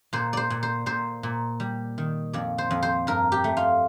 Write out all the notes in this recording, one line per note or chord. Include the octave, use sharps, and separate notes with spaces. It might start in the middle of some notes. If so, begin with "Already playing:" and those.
A#2 C5
C5 D5
A#2
C5
A#2 C5
A#2
G3
D#3
F2 D5
C5
F2
C5
G2 A#4
G4
A3
F4